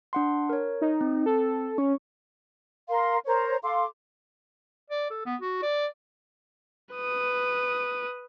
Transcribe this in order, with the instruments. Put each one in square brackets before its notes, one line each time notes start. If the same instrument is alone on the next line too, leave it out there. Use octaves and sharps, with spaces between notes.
[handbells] D4 F#5 C6
A#4 C#5
[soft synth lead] D#4
[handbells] C4
[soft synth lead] A4
[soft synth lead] C#4 [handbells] C#6
[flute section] A#4 F5 C6
A#4 C5 C#5 A#5
A4 F5 C6 D6
[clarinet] D5
A4
B3
F#4
D5
[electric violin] B4 D#6